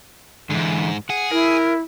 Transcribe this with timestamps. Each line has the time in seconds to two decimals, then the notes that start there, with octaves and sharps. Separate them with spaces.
0.50 G#2 D3 E3
1.10 G#4 F#5
1.32 E4 A#4